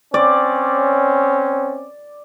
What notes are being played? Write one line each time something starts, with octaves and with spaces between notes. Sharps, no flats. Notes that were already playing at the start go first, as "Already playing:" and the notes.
C4 C#4 D5